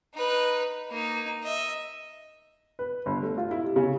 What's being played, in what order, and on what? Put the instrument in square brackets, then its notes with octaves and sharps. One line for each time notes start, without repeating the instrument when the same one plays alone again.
[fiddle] D#4 B4
A#3 D#4
D#5 E5
[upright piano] B4
G1
A3
F4
E4
C3
C#3